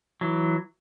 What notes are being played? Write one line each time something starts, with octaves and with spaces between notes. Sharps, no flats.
E3 F#3